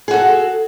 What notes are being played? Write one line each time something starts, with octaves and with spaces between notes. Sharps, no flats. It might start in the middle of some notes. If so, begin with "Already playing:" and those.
F#4 G#4 A4